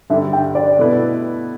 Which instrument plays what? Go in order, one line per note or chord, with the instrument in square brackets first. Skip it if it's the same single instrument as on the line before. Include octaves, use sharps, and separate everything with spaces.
[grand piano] G2 D3 G3 D4 [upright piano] E5
[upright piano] G5
D5
[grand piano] B2 A3 E4 B4